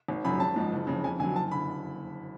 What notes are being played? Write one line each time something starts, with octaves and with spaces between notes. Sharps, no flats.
G#1
F#2 C#3 F3 B5
G#1 A5
G#2 F3
F#1
F2 C#3
F2 G#5
D3 F#3 G#5
F#1 A5
D3 B5